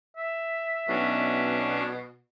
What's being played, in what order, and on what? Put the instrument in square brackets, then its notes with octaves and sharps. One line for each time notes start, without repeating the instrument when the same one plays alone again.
[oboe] E5
[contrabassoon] B1 [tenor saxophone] B2 [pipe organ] C#4 D4